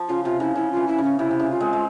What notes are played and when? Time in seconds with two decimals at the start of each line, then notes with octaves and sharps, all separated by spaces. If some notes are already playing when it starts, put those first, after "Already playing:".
Already playing: F3
0.08 C#3 F4
0.24 C3 F4
0.40 C#3 E4
0.55 C#3 E4
0.71 F4
0.77 E3
0.88 E4
0.98 C#3 C#4
1.19 C3 E4
1.31 C3
1.40 C#3
1.51 F4
1.60 G#3 C4
1.73 G#3